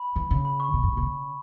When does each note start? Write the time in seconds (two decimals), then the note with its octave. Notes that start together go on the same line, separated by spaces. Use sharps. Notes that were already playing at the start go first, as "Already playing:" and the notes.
Already playing: B5
0.16 E3
0.31 C#3
0.45 B5
0.60 C#6
0.73 B2
0.83 G2
0.92 A#2
0.97 B2
1.02 C#3